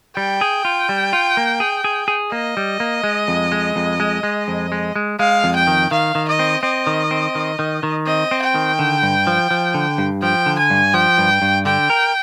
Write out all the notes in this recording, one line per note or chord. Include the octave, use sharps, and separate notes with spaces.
G3 G5
G#4
F4
G3
F4
A#3
G#4
G#4
G#4
A#3 D#5
G3
A#3
G#3
F2
G#3
F2
G#3
G#3
F2
G#3
G#3
G#3 F5
F2
G5
D#3
D#3 F5
D#3
D#5
C4
C4 D#5
D#3
C4
D#3
D#3
D#3
C4 D#5
C4
G5
D#3
D3
G2
F3
F3
D3
G2
F3 G5
D3
G#5
G2
F3 G5
G2
G2
D3 G5
A#4